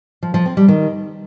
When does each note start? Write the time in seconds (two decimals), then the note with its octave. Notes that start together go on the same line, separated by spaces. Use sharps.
0.23 F3
0.34 F3
0.45 C4
0.57 G3
0.68 D#3